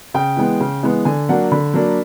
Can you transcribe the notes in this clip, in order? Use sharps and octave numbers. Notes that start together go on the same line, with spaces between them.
C#3 G5
E3 G#3 B3
C#3
E3 G#3 B3
D3 G#5
F#3 A#3 D4 F#5
D3 B5
F#3 A#3 D4